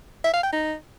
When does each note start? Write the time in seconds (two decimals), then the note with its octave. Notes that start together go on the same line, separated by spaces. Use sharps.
0.24 E5
0.34 F5
0.43 G5
0.53 D#4